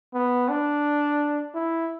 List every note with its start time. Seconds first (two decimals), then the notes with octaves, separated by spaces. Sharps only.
0.14 B3
0.49 D4
1.55 E4